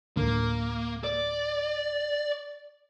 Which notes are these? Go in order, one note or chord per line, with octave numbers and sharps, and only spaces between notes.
D1 D3 A#3
D5